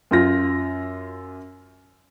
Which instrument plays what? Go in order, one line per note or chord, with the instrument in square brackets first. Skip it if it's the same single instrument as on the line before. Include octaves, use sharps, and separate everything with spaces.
[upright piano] F#2 F4 A#6